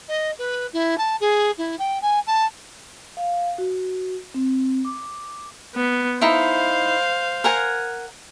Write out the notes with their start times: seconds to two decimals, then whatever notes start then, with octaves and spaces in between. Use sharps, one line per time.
0.08 D#5
0.38 B4
0.73 E4
0.98 A5
1.20 G#4
1.58 E4
1.79 G5
2.01 G#5
2.26 A5
3.17 F5
3.58 F#4
4.34 C4
4.85 D6
5.75 B3
6.21 D#4 E4 C5 F5
7.44 A#4 F#5 G#5